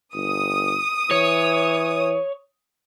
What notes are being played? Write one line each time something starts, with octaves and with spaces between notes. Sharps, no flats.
G1 D#6
E3 C#5